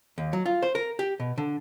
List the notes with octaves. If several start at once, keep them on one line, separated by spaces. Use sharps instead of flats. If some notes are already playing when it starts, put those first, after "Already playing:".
D#2
F#3
F4
C5
A#4
G4
B2
D3